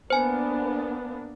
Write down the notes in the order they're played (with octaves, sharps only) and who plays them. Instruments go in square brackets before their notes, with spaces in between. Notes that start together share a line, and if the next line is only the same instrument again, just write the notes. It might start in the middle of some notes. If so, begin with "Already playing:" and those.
[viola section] A#3 B3 D4 [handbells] C5 G#5